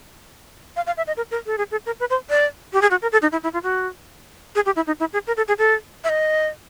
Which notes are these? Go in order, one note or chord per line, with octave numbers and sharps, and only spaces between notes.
F5
F5
E5
D#5
A#4
A#4
A4
G#4
A4
A#4
B4
C5
D5
G4
G#4
F#4
A#4
A4
D#4
E4
E4
F4
F#4
G#4
G4
E4
D#4
E4
G#4
A#4
A4
G#4
A4
E5
D#5